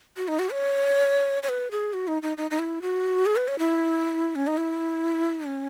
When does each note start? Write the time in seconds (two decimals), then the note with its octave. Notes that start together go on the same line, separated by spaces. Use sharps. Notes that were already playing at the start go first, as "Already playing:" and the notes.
0.17 F#4
0.28 D#4
0.39 F#4
0.50 C#5
1.43 C#5
1.49 B4
1.71 G#4
1.93 F#4
2.08 D#4
2.22 D#4
2.37 D#4
2.51 D#4
2.59 E4
2.82 F#4
3.26 G#4
3.36 B4
3.48 C#5
3.59 E4
4.35 C#4
4.47 D#4
4.58 E4
5.46 C#4